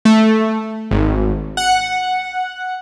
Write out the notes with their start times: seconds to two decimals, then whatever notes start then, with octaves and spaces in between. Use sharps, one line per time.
0.05 A3
0.91 G#1
1.57 F#5